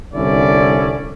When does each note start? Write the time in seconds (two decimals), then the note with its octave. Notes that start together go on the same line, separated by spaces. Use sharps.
0.14 C2 D3 C#4 E4 D5